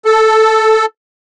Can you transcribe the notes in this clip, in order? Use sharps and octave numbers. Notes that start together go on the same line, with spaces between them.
A4